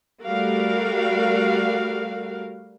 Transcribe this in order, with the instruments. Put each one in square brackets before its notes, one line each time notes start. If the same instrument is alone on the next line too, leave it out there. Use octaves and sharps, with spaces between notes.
[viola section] G3 A3 F#4 A#4 F5